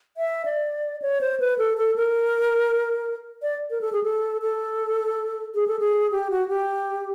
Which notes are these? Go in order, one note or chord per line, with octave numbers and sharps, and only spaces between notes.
E5
D5
C#5
C5
B4
A4
A4
A#4
D5
A#4
A4
G#4
A4
A4
G#4
A4
G#4
G4
F#4
G4